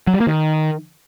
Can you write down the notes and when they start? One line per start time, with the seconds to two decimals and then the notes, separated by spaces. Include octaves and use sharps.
0.07 F#3
0.14 G3
0.20 A#3
0.27 D#3